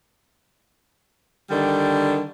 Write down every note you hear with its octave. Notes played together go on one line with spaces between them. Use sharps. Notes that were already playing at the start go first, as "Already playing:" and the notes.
D3 D#3 G3